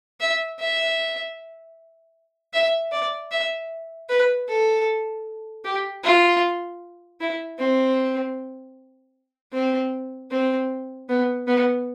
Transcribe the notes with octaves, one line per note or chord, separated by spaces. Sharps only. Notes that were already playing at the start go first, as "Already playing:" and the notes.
E5
E5
E5
D5
E5
B4
A4
G4
F4
E4
C4
C4
C4
B3
B3